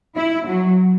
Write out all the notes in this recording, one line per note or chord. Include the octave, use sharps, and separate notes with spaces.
E4
F#3